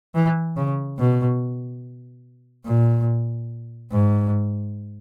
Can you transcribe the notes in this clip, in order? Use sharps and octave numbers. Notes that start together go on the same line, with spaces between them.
E3
C#3
B2
A#2
G#2